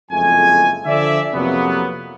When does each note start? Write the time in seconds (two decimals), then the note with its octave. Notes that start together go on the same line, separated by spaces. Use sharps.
0.11 F#1 F2 F3 G#3 A3 G#5
0.86 D3 F3 D5 E5
1.34 F2 C3 E3 F#3 A#3 B3